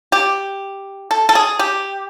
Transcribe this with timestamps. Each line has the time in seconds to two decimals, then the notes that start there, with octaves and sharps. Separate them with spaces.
0.12 G4
1.11 A4
1.29 A4
1.35 G#4
1.59 G4